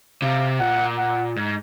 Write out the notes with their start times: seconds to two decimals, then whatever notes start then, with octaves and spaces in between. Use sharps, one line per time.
0.22 C3 F5
0.60 A#2 F#5
0.98 F#5
1.36 G#2